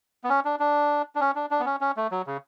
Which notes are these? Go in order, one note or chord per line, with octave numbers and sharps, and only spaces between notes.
B3
C#4
D4
D4
D4
C#4
D4
D4
B3
C#4
C#4
A3
F#3
C#3